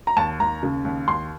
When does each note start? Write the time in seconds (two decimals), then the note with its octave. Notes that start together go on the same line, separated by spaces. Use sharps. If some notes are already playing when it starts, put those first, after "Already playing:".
0.07 A#5
0.16 D#2 A5
0.40 D#2 A#5
0.63 C#3
0.85 D#2
1.08 D#2 C6